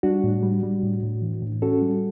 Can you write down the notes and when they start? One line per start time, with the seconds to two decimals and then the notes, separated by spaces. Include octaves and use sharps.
0.03 G3 D4 F#4
0.24 A2
0.43 G3
0.63 G3
0.83 A2
1.03 A2
1.22 E3
1.42 A2
1.62 C#4 F#4 A4
1.82 G3